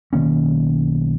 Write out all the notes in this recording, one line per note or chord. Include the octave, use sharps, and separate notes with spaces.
B1 D#3 A#3 C#4